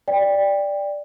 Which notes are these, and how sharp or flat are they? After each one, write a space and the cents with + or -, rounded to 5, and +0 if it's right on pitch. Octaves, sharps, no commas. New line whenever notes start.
D5 +0 G5 +20